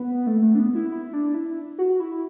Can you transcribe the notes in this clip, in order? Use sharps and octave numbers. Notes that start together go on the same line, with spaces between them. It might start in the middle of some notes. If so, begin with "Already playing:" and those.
Already playing: B3
A3
A3
D4
B3
E4
E4
D4
E4
F#4
E4